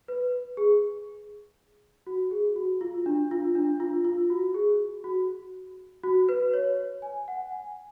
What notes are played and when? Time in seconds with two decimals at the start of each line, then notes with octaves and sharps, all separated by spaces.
0.08 B4
0.57 G#4
2.07 F#4
2.31 G#4
2.56 F#4
2.81 F4
3.06 D4
3.31 F4
3.55 D4
3.80 F4
4.05 F4
4.30 F#4
4.54 G#4
5.04 F#4
6.03 F#4
6.29 B4
6.53 C#5
7.02 G#5
7.28 F#5
7.52 G#5